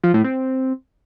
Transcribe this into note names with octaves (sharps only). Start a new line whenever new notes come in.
F3
A2
C4